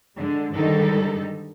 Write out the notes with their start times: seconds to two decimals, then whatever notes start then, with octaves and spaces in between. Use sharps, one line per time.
0.16 D3 G#3
0.54 G#2 D3 D#3 G3 D#4 A4